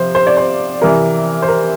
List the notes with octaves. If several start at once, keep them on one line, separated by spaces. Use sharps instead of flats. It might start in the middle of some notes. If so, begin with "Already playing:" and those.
Already playing: C3 F3 C5
C5
D5
C5
C3 E3 A#4
C5
A#4